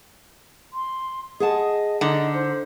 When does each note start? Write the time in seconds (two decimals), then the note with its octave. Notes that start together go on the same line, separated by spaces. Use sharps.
0.73 C6
1.40 G#4 D#5 F#5 A5
2.01 D3 D#4 D#5
2.34 C5